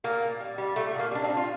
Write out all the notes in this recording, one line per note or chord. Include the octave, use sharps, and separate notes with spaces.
A#2 A#3
A#2
G3
G3
A#2 A3
A#2 A#3
G3 D4
C4
G3
F4